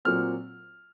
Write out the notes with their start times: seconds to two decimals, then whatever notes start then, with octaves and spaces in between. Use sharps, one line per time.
0.05 A#2 F#3 C4 F6